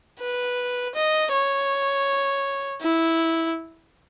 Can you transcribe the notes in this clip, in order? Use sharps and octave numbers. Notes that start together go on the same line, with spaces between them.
B4
D#5
C#5
E4